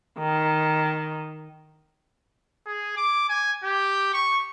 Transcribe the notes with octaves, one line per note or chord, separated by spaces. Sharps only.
D#3
G#4
D6
G#5
G4
C#6